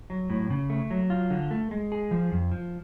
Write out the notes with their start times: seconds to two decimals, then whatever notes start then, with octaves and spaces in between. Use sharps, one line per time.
0.10 F#3
0.30 A2
0.50 C#3
0.70 A3
0.91 F#3
1.10 F4
1.30 D3
1.51 A3
1.71 G#3
1.92 G#4
2.11 F3
2.32 F2
2.51 F3